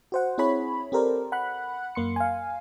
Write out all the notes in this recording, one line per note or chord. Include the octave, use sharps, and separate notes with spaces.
F#4 C5 F#5
C4 E4 G#4 C#5 B5
C4 G4 A4 A#4 C5 D5
F#5 B5 F#6
F#2 A#3 C6 C#7
F5 G#5